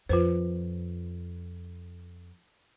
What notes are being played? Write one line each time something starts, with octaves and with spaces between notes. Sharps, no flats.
F2 F4 B4 C5